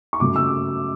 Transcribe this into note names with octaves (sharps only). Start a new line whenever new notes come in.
C#6
C#3 F#3 A3 D6
E6